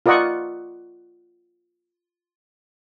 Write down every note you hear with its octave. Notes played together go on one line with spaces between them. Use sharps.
F4 A#4 D5 D#5 F#5 C#6